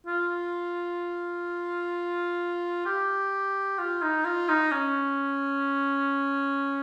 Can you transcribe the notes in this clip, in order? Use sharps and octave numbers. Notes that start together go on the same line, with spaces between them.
F4
G4
F4
D#4
F4
D#4
C#4